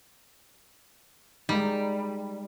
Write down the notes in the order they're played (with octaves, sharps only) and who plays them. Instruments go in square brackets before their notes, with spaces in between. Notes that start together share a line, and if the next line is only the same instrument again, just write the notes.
[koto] G3 [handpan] G#3 D#4